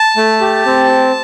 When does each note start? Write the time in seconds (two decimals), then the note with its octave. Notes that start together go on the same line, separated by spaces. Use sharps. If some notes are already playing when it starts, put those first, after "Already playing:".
Already playing: A5
0.17 A3
0.41 G4
0.66 C4